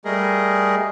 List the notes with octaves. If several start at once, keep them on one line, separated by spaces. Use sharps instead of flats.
G3 A3 G#4 A#4 D#5